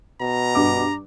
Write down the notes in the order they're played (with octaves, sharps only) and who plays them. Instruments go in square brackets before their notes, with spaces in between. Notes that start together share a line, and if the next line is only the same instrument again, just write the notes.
[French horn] B2 [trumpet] A#5
[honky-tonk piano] G2 D6